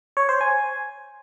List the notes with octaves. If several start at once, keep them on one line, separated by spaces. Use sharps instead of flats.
C#5
C5
G#5